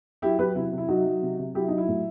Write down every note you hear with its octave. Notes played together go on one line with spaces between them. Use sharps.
F#3 E4 G4
F#3 G4 B4
C3 E4
C3
E4
F#3 D#4 F#4
F#3
C3
C3
F#3 E4 G4
F#3 D#4
E4
A2